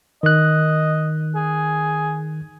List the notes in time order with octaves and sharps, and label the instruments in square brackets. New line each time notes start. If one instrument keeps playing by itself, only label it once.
[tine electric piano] D#3 F#6 [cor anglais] D#5
[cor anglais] G#4